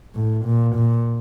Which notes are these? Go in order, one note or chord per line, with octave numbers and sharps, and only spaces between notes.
A2
A#2
A#2